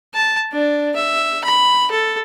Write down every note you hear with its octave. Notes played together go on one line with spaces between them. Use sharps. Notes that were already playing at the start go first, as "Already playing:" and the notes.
A5
D4
E5
B5
A4